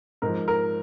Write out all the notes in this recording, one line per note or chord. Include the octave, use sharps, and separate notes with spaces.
G#2 F3 A#4
A#4